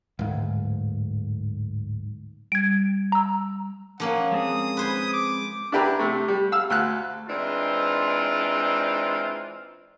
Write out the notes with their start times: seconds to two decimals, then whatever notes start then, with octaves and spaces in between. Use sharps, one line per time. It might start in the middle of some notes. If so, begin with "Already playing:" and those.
0.19 D1 G#2
2.52 G3 G#6 D7
3.12 A#5 E6
4.00 F3 A#3 C#4 F#5
4.32 G#3 C4 G#4 D#6
4.77 B4 C5 G#5
5.13 D6
5.72 D4 E4 G4 B4 A#5
5.99 C3 A3
6.28 G3
6.52 F5 E6
6.70 D2 F5 F#6
7.28 E3 G#3 C4 D4 D#4 F4